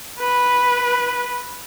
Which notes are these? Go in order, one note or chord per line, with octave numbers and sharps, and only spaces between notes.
B4